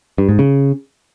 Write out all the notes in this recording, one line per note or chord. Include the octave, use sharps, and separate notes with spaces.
G2
G#2
C#3